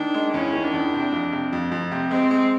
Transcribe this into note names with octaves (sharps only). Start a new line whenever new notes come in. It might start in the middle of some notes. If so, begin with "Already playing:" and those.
Already playing: D#3 D4
G#3
E2 C#4
D#3
D4
E2
C3
F2
C3
F2
F2
C3
G#3 C4
G#3